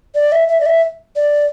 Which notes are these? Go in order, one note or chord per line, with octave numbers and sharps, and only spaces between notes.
D5
E5
E5
D5
E5
D5